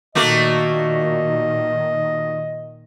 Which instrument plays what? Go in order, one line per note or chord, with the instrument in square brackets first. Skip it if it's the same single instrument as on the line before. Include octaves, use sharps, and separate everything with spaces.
[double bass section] A#2 D#3 [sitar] A3 A#3 F#4 [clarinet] D#5